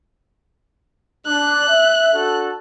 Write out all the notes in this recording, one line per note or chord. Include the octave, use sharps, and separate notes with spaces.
D4 F#6
E5
D4 F#4 A4